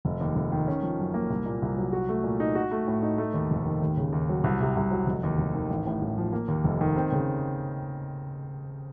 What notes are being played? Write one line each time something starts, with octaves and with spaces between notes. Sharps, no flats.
F1
D#2
F1
D#3
C#4
F3
F#2
A#3
C2
A#2
C2
F#3
F#4
A3
A#2
D#4
F#4
A3
A2
D#4
A3
D#2
F1
D#3
D#2
C#3
D#2
F#3
C2
C3
C2
F#3
F1
D#2
F1
D#3
A1
A2
A1
F3
A#3
D#2
F1
D#3
C4
C#3